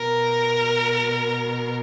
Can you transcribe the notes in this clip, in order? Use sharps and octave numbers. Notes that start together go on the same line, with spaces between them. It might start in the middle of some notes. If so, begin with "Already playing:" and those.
Already playing: B2 A#4